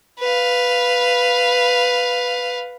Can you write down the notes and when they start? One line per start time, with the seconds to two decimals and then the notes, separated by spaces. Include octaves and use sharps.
0.19 B4 F5